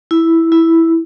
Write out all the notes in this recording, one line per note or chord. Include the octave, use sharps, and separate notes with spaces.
E4
E4